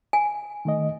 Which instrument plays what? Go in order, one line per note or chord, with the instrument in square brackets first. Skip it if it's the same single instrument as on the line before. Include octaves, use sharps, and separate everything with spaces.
[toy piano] G#5
[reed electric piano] D#3 A3 D#5